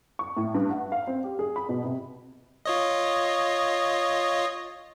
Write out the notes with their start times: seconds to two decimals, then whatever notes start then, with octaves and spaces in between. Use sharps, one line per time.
0.19 C#6
0.37 A2
0.54 G2
0.70 F#5
0.92 F5
1.07 C4
1.24 G4
1.39 G#4
1.56 B5
1.69 B2
1.84 C3
2.65 F4 C#5 D#5